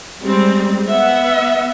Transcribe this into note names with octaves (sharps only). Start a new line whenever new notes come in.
G3 G#3 C4
B3 E5 F#5